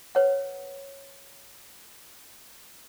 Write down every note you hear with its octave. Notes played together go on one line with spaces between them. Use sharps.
B4 C#5 F#5